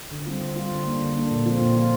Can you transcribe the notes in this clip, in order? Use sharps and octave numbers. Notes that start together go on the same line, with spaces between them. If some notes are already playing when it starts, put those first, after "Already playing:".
D3
G3 C4 F4
D3
G3 C4 F4
D3
A#3 D4
D3
A#3 D4
A#2
F3 C4 F4
A#2
F3 C4 F4